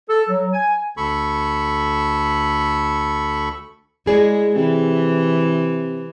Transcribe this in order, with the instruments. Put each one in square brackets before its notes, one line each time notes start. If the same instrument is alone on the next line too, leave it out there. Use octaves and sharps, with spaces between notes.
[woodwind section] A4
F#3
G#5
[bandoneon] D2 A4 B5 C#6
[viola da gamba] G#3 [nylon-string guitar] E4 G#4 D5
[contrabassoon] C3 [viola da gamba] E3